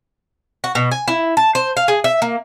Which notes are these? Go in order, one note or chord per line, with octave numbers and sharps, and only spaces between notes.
F#4
B2
G#5
E4
A5
C5
F5
G#4
E5
A#3